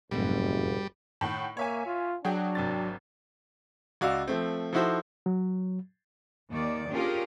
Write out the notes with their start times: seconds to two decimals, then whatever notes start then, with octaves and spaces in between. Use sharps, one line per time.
0.11 F#1 F2 G#2 B2 G3
1.21 A2 D#3 F#5
1.57 A#3 C#5 E5 G#5
1.86 F4
2.25 F#3 D4 F#4 G#4 G5
2.55 G#1 C3 A6
4.01 C#2 F#4 D5 F5 E6
4.28 F3 A3 C4
4.73 F3 D#4 E4 F#4 A4 C5
5.26 F#3
6.51 D#2 D#3 D5
6.91 C#4 D4 F4 G4 G#4 A#4